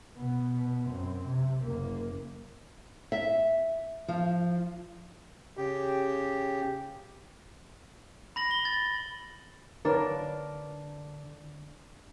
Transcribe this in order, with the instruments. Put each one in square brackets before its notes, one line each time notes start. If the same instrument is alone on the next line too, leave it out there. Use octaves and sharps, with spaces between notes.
[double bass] B2 B3
F#2 C4
C3
F#1 A#3
[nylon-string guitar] E5
F3
[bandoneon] C#3 G4
[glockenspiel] B5 A#6 F#7
G7
A6
[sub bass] D3 [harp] D4 [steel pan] A#4 B4 C#5